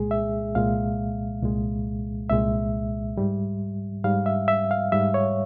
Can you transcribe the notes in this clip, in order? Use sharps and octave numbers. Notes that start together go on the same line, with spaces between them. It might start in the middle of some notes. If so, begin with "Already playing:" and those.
Already playing: C2 A#2 G#3 G#4
E5
C2 A#2 G#3 F5
C2 A#2 G#3
C2 A#2 G#3 E5
G#2 G3
G#2 G3 F5
E5
E5
F5
G#2 G3 E5
C#5